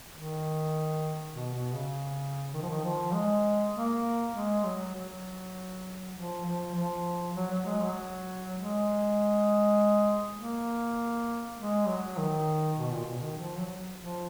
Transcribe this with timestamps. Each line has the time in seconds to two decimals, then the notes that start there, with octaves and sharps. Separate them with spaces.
0.14 D#3
1.34 B2
1.54 B2
1.74 C#3
2.54 D#3
2.62 F3
2.70 D#3
2.84 F3
3.14 G#3
3.75 A#3
4.35 G#3
4.65 F#3
4.95 F#3
6.16 F3
6.46 F3
6.75 F3
7.36 F#3
7.51 F#3
7.66 G#3
7.81 F#3
8.56 G#3
10.37 A#3
11.57 G#3
11.87 F#3
12.18 D#3
12.78 B2
12.93 A#2
13.07 B2
13.22 D#3
13.38 F3
13.57 F#3
13.98 F3